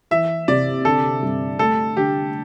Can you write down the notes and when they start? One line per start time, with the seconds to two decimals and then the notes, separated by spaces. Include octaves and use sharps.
0.11 E3 E5
0.48 C3 D5
0.85 D3 A4
1.22 G2
1.59 A3 A4
1.97 D3 G4